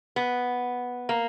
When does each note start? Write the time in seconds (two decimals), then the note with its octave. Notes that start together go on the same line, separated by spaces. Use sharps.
0.16 B3
1.09 A#3